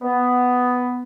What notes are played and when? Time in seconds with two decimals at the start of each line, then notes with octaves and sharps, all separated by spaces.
0.01 B3